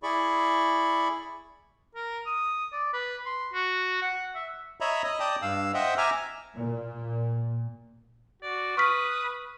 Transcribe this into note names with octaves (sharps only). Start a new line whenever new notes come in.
E4 G#4 D5 B5 C#6
A#4
D#6
D5
B4
C6
F#4
F#5
E5
C#5 D#5 E5 A#5 B5
D#5
D5 G5 A5 D#6
G2 F5 E6
C5 D#5 E5 F#5 G5
E5 G#5 A#5 D6 F6
A#2
F#4 D5
B4 C#6 D#6 F6 B6